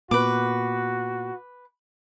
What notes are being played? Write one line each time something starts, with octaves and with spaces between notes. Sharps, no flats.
A#2 B3 F#4 B4 D6